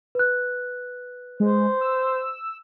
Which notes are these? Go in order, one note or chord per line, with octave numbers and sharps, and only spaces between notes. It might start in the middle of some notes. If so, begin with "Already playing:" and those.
B4 F#6
G#3 C5
E6